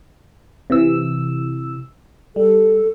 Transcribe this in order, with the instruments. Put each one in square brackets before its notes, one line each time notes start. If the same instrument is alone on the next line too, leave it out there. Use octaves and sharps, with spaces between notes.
[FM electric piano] C3 E3 E6
[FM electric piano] G3 [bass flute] A4